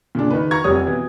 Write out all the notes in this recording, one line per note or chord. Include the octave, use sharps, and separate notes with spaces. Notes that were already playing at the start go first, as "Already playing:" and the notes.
A#2 C#3 D4
D#3 B4
A#5 C#6 G#6
F1 G3 C#5 D#6
B2 E3